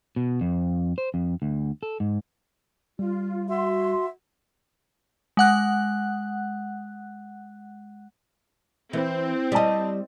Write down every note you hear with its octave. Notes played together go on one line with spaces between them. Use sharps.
B2
F2
C5
F2
D2
A4
G#2
G3 F4
F#4 E5 C6
G#3 F#5 F#6
E3 C4
G3 D5 D#5 A5